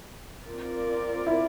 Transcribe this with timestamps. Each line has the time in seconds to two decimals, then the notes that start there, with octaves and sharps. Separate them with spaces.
0.46 C4 F4 A#4 D5
1.27 E4